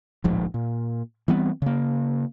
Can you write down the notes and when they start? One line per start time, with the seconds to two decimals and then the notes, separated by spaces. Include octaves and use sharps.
0.24 D1 A#1 G#2 F3
0.54 A#2
1.28 E3 G3 B3 C4
1.62 C#3 A#3